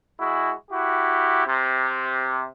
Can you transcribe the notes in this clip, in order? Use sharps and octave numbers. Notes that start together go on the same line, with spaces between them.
G#3 E4 F#4
E4 F#4 G4
C3